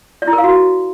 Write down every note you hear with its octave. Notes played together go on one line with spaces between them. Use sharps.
D5
E4
A#4
F5
F#4